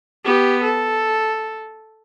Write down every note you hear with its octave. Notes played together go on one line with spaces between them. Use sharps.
B3 G4
A4